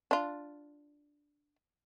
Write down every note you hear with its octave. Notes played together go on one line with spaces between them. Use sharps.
D4 F4